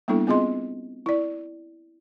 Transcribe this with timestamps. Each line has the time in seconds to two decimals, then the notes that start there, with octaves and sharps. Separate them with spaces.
0.08 G3 A#3 B3 D4 E4 A4
0.27 B3 C4 F4 G#4 D#5 C6
1.06 E4 D5